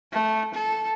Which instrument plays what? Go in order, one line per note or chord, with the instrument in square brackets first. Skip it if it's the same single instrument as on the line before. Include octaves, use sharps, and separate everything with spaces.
[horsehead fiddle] A3
A4